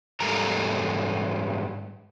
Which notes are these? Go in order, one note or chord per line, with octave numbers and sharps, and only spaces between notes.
G#2 G3 A4 A#4 A#5